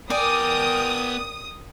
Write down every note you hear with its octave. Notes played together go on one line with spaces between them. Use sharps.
B3 A#4 D5 G5 G#5 D#6